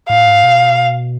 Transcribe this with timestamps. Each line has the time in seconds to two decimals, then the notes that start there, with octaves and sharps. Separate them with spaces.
0.09 A2 F5
0.26 G#2
0.43 B2